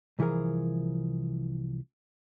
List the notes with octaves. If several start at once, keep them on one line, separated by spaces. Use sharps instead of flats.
C2 E3 F3 G#4 A#4